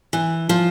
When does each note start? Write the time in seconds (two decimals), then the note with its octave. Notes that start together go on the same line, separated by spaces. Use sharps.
0.13 E3
0.49 F3